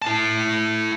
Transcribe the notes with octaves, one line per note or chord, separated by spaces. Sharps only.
E4 A5